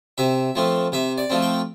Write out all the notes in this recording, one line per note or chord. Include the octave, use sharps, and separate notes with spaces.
C3 E5
F3 A3 C4
C3 E5
D5
F3 A3 C4
G5